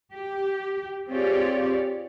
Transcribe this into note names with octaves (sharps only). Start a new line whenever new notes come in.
G4
C4 F4 G4 G#4 C#5 D5